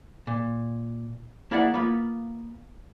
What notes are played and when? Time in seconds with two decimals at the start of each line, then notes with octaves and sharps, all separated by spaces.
0.27 A#2
1.51 A#3 E4 G#4 D5 E5 F#5
1.74 A#3 B3 F4 B5